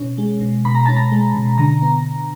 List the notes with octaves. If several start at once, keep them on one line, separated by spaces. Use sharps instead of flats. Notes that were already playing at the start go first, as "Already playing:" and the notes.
Already playing: B2 C#4
G#3
B2
B2 B5
A#5
C#4 A5
A#5
G#3
B2
D3 A#5
B3